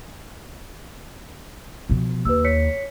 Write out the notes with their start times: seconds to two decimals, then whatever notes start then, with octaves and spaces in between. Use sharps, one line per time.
1.89 B2 F3
2.25 D#2 B4 E6
2.44 C#5 B6 C#7